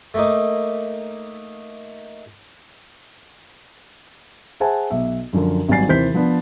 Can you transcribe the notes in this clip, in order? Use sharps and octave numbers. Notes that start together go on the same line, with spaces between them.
A3 A#3 D#4
G#4 C5 E5 F#5 G#5 A5
B1 E5
F#2 D3 F3
G#1 F#3 G3 G#5 A6 C7
D#2 C3 E3 C5 G6 B6
F3 B3 D4